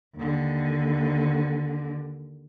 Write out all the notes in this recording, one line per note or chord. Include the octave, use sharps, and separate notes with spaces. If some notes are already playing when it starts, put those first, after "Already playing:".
D#2 D3